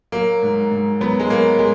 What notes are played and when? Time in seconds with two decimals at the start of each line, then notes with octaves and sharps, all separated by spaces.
0.12 F#3 A#3
0.43 G#2
0.71 G#2
1.01 F#3 B3
1.20 G#3
1.30 F#3 A#3
1.59 G#3